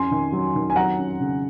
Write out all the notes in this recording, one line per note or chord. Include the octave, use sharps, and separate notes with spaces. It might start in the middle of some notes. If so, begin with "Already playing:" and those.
Already playing: F2 C#4 G#5 C6
D#3
F#3
D#3
G#5
F#3 F#5 A#5
C#4
C#3